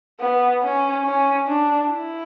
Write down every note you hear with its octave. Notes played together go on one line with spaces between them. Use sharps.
B3
C#4
C#4
D4
E4